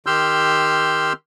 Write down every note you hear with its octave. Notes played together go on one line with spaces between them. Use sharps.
D#3 G4 C6 E6 F6 G6